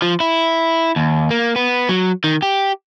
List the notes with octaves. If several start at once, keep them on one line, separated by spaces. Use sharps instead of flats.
F3
E4
D#2
A#3
B3
F#3
D#3
G4